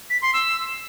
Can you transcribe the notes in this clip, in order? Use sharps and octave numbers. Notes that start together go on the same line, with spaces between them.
B6
C6
E6